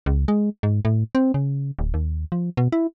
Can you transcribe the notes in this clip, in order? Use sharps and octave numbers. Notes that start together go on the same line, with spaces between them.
C#2
G#3
G#2
A2
C4
C#3
D1
D#2
F3
B2
E4